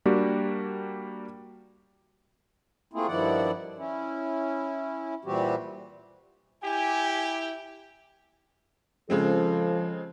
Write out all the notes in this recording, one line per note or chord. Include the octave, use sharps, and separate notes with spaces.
G3 A#3 D4 F#4 G4
A3 A#3 C4 E4 F4 G#4
G2 D#3 F3 E4 D5 F#5
C#4 E4
A#2 E3 G3 C4 F#4 G4
E4 G4 G#5
C#3 F3 G#3 C4 A4